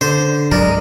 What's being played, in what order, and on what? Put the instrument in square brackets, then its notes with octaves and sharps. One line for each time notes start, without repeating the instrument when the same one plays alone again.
[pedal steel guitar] D3 [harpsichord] C5
[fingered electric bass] C2 G#2 F#3 [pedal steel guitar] G#3 [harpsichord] A#4 [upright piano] D5